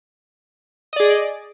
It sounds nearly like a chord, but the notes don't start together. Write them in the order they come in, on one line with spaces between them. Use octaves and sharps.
D#5 D5 G#4